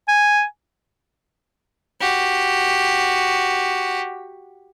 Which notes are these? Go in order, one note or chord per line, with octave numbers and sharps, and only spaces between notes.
G#5
F#4 G4